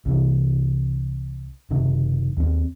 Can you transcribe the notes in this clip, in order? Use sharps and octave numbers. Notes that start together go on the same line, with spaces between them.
C2 C3 E3
F#1 C3 D#3
D#2 C4